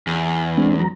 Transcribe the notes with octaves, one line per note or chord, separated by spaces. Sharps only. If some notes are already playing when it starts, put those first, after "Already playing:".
E2
G#3 C4 D4
F#3 A#5